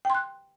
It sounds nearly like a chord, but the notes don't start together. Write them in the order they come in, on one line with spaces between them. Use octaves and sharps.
G5 C6 F#6